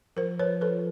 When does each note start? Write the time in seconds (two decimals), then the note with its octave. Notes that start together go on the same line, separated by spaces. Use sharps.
0.17 F3 A#4 C5
0.39 B4 C#5
0.61 A4 B4